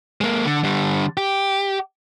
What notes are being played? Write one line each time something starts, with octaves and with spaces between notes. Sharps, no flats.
G#3 A#3
D3
D3 G3
G4